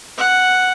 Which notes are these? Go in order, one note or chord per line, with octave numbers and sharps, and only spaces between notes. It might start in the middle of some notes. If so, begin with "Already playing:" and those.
F#5